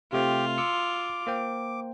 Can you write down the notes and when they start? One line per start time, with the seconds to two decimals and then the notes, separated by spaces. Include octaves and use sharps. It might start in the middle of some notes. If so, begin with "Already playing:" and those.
0.13 C3 A3 C4 F4 G4
0.58 C6 D6 E6 C#7
1.27 A#3 C5 G5